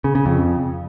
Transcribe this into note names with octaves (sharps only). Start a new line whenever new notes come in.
C#3
C#3
F2